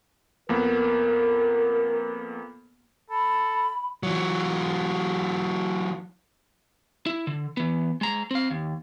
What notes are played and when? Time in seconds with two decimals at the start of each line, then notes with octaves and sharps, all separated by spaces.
0.49 F2 A#3 B3 A#4
3.10 A4 B5
4.03 E3 F#3
7.06 E4
7.27 D3
7.57 E3 B3
8.01 G#3 A#5
8.31 C4 F5
8.51 D#2